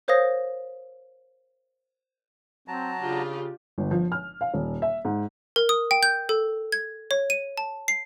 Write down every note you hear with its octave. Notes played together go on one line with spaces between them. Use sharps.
A#4 C5 C#5 F5 D#6 A#6
F#3 C4 A5 A#5
C#3 D4 F4 G4
G1
F3
F6
F5
D#1
E5
G#2
A#4
D#6
G5
G6
A4
G#6
C#5
D#7
A5
C7